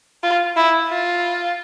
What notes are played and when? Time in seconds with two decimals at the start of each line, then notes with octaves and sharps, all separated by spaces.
0.23 F4
0.57 E4
0.89 F4